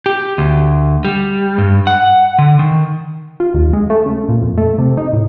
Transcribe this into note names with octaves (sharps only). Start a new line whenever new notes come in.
G4
D2
G3
G2
F#5
D3
D#3
F4
D#2
G#3
A3
C#3
A#2
F2
A3
C3
D#4
A2